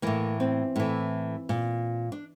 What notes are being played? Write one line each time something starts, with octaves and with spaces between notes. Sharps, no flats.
A2 E3 A#3
C4
A2 E3
A#2
D4